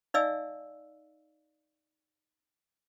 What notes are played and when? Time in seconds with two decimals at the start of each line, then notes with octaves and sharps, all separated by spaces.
0.14 D#4 D5 D#5 F5 G#5 E6